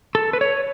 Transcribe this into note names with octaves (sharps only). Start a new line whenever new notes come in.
A4
B4
C#5